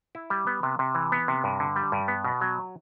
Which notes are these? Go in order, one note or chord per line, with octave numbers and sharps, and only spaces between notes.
E4
G3
B3
C3
C3
E3
B3
C3
G2
D3
G3
G2
B3
B2
F#3